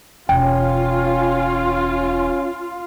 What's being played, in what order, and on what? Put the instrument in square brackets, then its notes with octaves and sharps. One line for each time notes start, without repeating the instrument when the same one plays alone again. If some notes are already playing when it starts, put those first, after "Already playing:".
[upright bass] E1 [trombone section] C#4 [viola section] F4 [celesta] G5